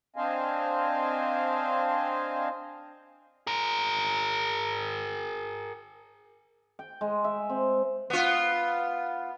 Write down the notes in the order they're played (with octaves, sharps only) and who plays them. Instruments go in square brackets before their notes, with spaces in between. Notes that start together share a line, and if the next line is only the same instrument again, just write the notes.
[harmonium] C4 D4 C5 D#5 F5 G#5
[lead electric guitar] G#4 A#4
[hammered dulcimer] G5
G#3
E5
C4
[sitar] B3 F4